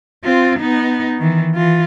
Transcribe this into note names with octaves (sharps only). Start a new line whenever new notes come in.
C4 F4
B3 D#4
D#3 E3
E3 F4